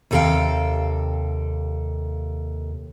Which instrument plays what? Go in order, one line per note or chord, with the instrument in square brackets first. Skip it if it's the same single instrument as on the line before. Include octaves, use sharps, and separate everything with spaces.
[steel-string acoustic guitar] D#2 C3 A4 E5 F5 G5